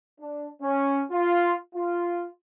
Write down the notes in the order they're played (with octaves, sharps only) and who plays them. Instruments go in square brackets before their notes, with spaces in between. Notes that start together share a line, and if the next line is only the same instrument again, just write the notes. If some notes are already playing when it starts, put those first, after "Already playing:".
[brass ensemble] D4
C#4
F4
F4